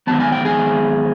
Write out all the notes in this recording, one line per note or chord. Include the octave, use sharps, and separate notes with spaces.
G#2 D#3 F#3 B3 A5
G#5
G5
G#4 G#5